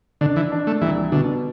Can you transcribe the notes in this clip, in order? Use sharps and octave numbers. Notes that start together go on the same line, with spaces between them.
D3 D4
E3
D4
A3
C2 E3
B2 D3